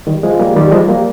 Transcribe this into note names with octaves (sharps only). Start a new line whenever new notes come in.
D#3 G3
F3 G#3
G3 A#3
D#3 G3
F3 G#3
G3 A#3